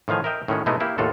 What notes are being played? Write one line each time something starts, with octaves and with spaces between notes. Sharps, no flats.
A2 D#3 F3 F5 G#5
A#4 D#5 E5 G5
A2 D#3 C#4 F#4
B2 G#3 A3 B3 D#4 E4
A#3 E4 G4
D#2 A2 F4 F#4 A4